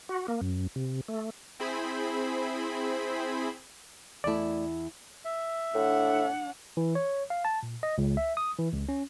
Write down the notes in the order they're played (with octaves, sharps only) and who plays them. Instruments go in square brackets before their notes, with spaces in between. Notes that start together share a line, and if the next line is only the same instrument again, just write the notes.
[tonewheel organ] F#4
A#3
F#2
C3
A3
[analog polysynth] C4 E4 G#4 C5 B5
[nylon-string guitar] E2 E4 [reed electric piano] A3 D5
[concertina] E5
[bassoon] A2 [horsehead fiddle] D4 F#5
[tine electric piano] E3
C#5
F5
A5
A#2
D#5
C#2
E5
D#6
E3
C#2
C#4